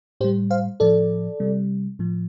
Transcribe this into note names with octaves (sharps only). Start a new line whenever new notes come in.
A2 G3 G4 C5
C5 F5
A2 F3 A4 D5
C3 G3
A2 F3